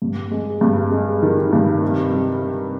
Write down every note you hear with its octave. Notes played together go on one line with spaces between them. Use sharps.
G2
G#3
G2
G#3
D#3
G2
C3
G3
C3